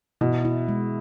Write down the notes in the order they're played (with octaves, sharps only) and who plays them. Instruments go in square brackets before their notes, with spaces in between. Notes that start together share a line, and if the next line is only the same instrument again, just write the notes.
[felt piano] B2 [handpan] E4
[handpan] E4
G#3